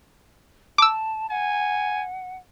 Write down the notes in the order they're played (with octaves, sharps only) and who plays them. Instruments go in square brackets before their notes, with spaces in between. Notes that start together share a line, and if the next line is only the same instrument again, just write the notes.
[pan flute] A5 [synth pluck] D6 E6
[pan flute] F#5 [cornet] G#5